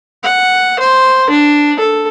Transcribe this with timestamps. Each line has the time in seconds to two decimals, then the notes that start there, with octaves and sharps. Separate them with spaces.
0.23 F#5
0.79 C5
1.29 D4
1.80 A4